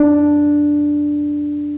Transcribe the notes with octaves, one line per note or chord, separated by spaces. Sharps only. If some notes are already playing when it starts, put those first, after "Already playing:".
Already playing: D4